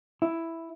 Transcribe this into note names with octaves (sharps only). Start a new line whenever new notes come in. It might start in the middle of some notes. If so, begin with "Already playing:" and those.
E4